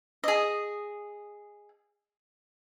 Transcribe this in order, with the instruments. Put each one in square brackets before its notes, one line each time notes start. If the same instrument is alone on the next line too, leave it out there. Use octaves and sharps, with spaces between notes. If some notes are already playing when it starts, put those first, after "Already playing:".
[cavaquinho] G#4 D#5